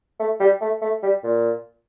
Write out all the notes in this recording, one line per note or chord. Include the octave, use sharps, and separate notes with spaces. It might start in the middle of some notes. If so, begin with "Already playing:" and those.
A3
G3
A3
A3
G3
A#2